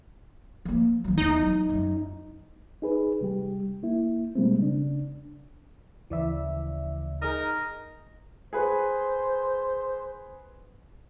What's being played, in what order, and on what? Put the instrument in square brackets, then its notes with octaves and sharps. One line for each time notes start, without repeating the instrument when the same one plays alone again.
[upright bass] F3 A#3
D#3 F#3
[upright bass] E2 [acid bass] D#4
[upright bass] F#3
F#2
[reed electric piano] D#4 G#4 B4
C3 G3 G4
A#3 E4
B2 G3 G#3 A#3 C4
C#3 D4
[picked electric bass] D2 C#3 F3 [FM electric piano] E3 D5 E5
[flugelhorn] D#4 [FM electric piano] G#4 D#5 D#6 [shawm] A#4
[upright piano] G#4 B4 [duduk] C5